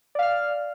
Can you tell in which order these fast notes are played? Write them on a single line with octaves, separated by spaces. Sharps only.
D5 F5 F6